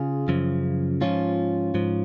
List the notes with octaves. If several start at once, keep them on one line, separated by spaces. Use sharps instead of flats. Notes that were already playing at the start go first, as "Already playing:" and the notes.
Already playing: C#3 F4 G#4
F#2 C#3 F3
G#2 F3 C#4 F4
G#2 F3